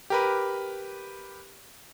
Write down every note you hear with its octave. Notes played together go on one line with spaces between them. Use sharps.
G4 A#4 B4